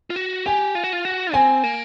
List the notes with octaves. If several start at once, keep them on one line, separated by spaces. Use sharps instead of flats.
F4
F#4
G4 G#5
F4
F#4
F4
F#4
C4 G#5
A#3